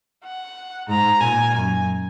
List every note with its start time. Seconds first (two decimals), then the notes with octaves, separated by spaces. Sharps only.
0.23 F#5
0.88 G#2 A#5
1.20 A#2 G#5
1.54 F#2 G#5